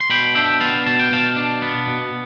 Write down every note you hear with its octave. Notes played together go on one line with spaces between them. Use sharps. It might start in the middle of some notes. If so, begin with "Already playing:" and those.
C6
B2 G5 B5
D4 E5 G5
B3 F5 A5
B2 A5
G5
B2 F5 A5
D4
B3
B2